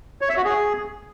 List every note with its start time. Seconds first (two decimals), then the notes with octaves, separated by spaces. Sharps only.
0.21 C#5
0.29 E5
0.37 F#4
0.45 G#4